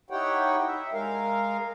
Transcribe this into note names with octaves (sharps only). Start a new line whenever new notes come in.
D#4 E4 G4 C#5 F#5 G5
E5
G#3 A#4 F5